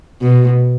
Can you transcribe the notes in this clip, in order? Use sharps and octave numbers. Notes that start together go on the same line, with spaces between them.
B2